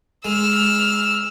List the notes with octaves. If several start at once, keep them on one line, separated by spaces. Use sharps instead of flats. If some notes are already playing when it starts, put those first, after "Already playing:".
G#3 E6 F6